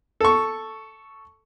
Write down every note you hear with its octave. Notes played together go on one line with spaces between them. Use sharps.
A4 C#6